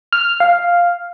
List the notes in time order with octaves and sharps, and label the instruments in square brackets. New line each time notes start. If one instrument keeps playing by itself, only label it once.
[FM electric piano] F6
F5